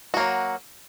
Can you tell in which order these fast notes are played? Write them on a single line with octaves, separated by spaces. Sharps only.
F#4 A#3 F#3